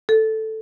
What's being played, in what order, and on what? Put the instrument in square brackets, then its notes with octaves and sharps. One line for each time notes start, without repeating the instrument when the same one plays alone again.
[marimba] A4